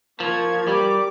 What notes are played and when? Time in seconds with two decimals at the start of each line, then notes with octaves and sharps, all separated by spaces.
0.20 F3 A#3 A#4 C#6 G#6
0.67 G3 G4 D6